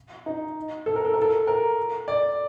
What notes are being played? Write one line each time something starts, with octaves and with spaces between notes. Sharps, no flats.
D#4
A4
A#4
A4
A#4
A4
A#4
D5